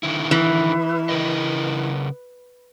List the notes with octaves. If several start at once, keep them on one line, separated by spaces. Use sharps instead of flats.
D3 D#3 E4
E3
C#3 A#4 D#5